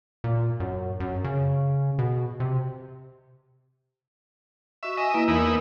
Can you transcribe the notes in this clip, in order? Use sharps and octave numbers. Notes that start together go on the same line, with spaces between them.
A#2
F#2
F#2
C#3
B2
C3
F#4 D#5 E5 C#6
D#5 E5 G#5
A#3 E4 B4
E2 A#3 D#4 E4 A#4